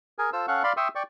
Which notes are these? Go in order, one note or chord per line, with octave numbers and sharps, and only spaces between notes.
G#4 A#4 G#5
F4 A4 C5 E6
C#4 A4 F5 F#5 C#6
D5 F5 B5 C6
E5 G5 C6 C#6 D#6 E6
D5 G5 C#6